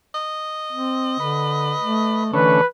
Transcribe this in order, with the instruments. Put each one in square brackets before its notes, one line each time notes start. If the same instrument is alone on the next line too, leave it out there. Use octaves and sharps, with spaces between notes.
[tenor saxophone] D#5
[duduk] C4
[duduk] D3 [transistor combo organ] B4
[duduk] A3
[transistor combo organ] D3 A3 C#4 [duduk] E3 [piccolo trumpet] B4